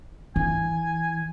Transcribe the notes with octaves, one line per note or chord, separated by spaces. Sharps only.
E3 G#5